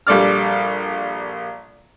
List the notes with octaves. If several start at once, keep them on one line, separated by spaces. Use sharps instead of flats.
A#1 G3 A4 D5 F6